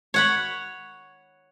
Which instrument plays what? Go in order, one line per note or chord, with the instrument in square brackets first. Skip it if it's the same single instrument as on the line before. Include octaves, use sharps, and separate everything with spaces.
[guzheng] C#5 F#5 B5